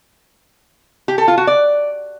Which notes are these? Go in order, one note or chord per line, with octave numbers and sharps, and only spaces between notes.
G4
A4
F4
F#4
D5